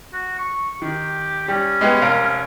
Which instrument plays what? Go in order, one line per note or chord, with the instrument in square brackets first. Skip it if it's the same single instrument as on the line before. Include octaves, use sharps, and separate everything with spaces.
[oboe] F#4
C#6
[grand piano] D#3 [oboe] G4
[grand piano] G3 G4 [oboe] C#4
[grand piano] G#3 B3 G4
F1 A#4 F5